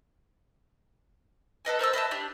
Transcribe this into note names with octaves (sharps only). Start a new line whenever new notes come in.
A4 B4 D#5 G#5
A#4 C5 A5 E6
B4 D#5 E5 A5
D4 G4